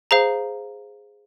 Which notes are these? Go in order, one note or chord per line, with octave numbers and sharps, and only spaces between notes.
G#4 C5 F5 A#5